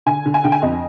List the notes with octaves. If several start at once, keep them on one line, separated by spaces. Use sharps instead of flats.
D3 G#5
D3
G#5
D3 G5
G#5
F2 D#5